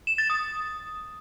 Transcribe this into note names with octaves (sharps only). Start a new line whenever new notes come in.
E7
A6
D#6